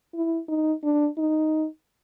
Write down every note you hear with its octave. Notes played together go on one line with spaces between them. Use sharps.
E4
D#4
D4
D#4